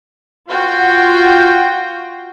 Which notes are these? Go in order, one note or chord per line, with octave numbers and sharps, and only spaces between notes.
F4 F#4 G5